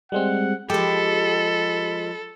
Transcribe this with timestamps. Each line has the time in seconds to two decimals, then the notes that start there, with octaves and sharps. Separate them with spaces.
0.12 G3 G#3 C4 F#5
0.70 F3 G#3 G4 A4 B5